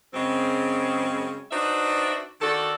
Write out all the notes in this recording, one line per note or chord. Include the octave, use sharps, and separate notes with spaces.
F#2 C#3 G#3 C4
D4 D#4 F#4 B4 C5 E5
D#3 D4 F#4 A4